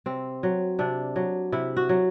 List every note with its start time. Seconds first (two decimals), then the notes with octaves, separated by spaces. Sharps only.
0.06 C3 C4
0.43 F#3
0.79 C3 D4
1.16 F#3
1.52 C3 E4
1.77 F#4
1.89 F#3